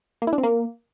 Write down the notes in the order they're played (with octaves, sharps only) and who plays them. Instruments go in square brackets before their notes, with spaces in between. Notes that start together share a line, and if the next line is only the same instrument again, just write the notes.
[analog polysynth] A#3
E4
D4
C4
A#3